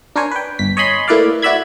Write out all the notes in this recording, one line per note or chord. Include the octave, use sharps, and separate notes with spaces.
D4 A#4 C5 C#5 G#5
B4 G5
G1 B6
C#5 D#5 G#5 B5 C6
A3 A#3 E4 B4 D5 F5
E4 F#4 D5 E5 B5 G#6